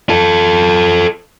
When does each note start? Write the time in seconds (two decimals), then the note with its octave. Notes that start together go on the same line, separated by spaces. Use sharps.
0.09 F4 A4